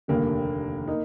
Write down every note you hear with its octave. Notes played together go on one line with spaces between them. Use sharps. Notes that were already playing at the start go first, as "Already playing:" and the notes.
F1 D#2 D3 G3 A#3
A#3 D#4